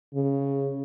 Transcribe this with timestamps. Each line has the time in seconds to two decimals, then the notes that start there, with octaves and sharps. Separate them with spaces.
0.14 C#3